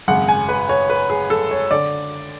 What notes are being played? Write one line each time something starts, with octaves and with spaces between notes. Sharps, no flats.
G#1 F#2 C#3 F#5
G#5
B4
C#5
B4
G#4
A4
C#5
D3 D5